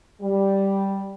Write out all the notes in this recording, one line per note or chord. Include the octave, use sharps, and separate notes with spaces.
G3